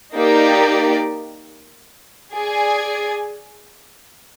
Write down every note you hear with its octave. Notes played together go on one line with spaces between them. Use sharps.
A#3 D#4 G4 D5
G#4 D5 G#5